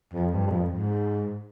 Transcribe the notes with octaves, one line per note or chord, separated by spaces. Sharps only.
F2
G2
G2
F2
G#2